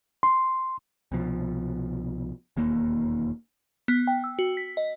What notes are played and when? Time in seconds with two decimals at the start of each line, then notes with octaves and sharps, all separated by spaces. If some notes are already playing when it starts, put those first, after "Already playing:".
0.23 C6
1.12 C2 B2 F3
2.57 E1 D#2 A#3
3.88 B3
4.07 G5
4.24 E6
4.39 F#4
4.57 B6
4.77 D#5